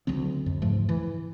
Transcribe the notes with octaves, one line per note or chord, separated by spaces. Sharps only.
D2 C#3 F#3 C4
F2
G#2 C#3 F3 A3
E3